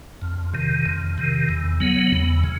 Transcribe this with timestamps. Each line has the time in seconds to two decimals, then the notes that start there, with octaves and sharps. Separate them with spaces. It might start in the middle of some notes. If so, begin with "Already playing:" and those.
0.22 F2
0.54 C3 D#3
0.85 F2
1.18 C3 D#3
1.49 E2
1.80 C#3 F#3 B3
2.12 E2
2.44 C#3